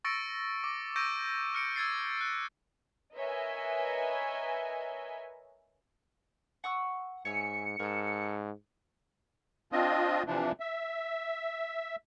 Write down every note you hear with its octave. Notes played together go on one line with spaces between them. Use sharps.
C#6 E6 A6 A#6 C#7 D7
D6
C#6 E6 G6 A#6 D7 D#7
F6 C#7 D7
E6 G#6 A6 C7
F#6
A#4 B4 C#5 D#5 E5 G#5
F#5 C#6 E6
G#2 C#5 E5 G#5 C#7
G#2 A4 A#4
C4 D4 F4 D#5
C3 E3 F3 D4
E5